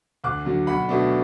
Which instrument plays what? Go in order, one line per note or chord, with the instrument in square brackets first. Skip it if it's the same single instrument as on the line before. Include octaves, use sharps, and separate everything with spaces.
[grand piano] D2 D6 F#6
D3 F#3
B1 F#5 B5
B2 A3 D4